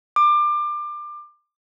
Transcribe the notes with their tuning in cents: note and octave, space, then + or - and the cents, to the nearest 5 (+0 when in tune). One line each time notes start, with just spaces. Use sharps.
D6 +25